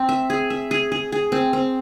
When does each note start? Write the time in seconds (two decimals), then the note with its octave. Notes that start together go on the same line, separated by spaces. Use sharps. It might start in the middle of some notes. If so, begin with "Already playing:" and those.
Already playing: C4
0.09 E5
0.30 G#4
0.50 E5
0.71 G#4
0.92 G#4
1.12 G#4
1.32 C4
1.53 C4